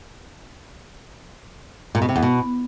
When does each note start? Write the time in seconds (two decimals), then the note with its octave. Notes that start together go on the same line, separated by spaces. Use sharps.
1.95 A#2
2.02 B2
2.09 C3
2.16 E2
2.23 B2